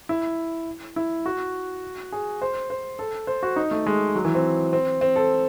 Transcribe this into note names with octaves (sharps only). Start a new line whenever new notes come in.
E4
E4
F#4
G#4
C5
C5
A4
C5
F#4
D#4
A3
G#3
F#3
E3
C4
C4
C4
A4